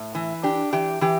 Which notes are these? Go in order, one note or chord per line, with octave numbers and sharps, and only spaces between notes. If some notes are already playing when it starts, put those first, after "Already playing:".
Already playing: A2
E3
D4 G4
E3 G4
E3 G4